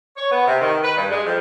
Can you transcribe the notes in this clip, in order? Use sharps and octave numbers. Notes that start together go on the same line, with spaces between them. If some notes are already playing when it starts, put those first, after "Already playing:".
C#5
B3
C3
D#3
B4
G2
G#3
F2